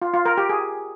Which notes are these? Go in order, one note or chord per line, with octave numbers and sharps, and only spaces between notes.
F4
F4
A#4
G4
G#4